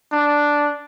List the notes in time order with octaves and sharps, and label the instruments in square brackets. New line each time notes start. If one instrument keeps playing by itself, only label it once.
[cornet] D4